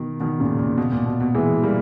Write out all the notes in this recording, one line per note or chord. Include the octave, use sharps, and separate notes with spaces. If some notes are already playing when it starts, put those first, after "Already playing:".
Already playing: B2 D#3
B2 D#3
A#2 C#3
A#2
B2
A#2
B2
B2
E3 G#3
G3 A#3